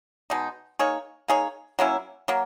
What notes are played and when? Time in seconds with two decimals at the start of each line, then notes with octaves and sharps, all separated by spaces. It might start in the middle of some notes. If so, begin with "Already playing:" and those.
0.30 B2 G#3 D#4
0.79 A#3 D#4 G#4 C#5
1.28 A#3 D#4 G#4 C#5
1.79 F#3 A#3 C#4 E4
2.28 F#3 A#3